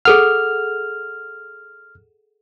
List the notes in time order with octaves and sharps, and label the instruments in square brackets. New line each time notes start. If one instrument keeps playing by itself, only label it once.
[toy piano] G#4 A4 F#5 [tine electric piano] F6